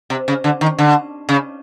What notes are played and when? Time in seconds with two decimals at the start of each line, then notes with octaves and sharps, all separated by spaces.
0.10 C3
0.28 C#3
0.44 D3
0.61 D#3
0.79 D3
1.29 C#3